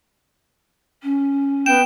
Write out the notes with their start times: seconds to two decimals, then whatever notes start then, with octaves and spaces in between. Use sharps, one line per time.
1.03 C#4
1.66 B3 G5 E7